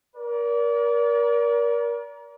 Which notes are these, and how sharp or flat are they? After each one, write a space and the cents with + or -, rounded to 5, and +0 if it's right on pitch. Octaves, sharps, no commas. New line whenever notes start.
A#4 +25 D5 -35